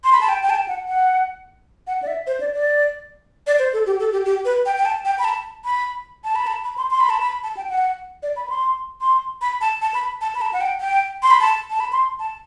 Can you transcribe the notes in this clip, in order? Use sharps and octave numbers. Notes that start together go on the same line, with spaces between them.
C6
B5
A5
G5
G5
A5
G5
F#5
F#5
F#5
D5
E5
C5
D5
D5
D5
C5
A4
G4
A4
G4
G4
B4
G5
G5
A5
G5
B5
A5
B5
A5
B5
A5
B5
C6
C6
B5
A5
B5
A5
G5
F#5
D5
B5
C6
C6
B5
A5
A5
B5
A5
B5
A5
F#5
G5
G5
C6
B5
A5
A5
B5
C6
A5